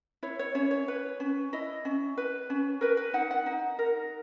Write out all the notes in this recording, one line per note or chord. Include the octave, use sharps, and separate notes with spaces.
E4 C#5
C#5
C#4 C#5
C#5
B4
C#4
E4 D#5
C#4
B4
C#4
A#4 B4
B4
D#4 F#5
F#5
D#4
A#4